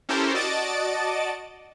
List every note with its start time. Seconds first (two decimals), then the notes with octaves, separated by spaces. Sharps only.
0.09 C#4 E4 G4 A4 A#4 C5
0.34 F#4 D5 D#5 A5 A6 D7